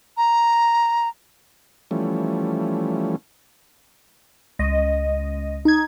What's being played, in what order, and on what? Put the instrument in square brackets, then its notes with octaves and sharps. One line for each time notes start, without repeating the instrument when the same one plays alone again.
[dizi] A#5
[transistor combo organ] E3 F3 G3 A3 C#4
[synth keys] C#2 D#5
D#4 G#6